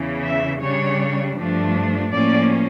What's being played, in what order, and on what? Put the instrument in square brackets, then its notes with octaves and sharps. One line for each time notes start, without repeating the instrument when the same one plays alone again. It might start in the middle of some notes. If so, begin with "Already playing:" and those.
Already playing: [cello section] E2 C#3 E3
E5
C#3 G3 D4 C#5
G2 F3 A3 D4
A2 F3 A#3 C#4 D5